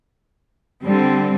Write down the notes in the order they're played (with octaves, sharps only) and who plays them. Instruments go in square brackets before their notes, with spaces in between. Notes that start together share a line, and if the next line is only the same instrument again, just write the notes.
[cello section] D3 G3 C4